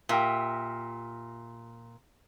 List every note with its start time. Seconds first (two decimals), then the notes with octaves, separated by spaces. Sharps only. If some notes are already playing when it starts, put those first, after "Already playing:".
0.09 A#2 G4 A#4 E5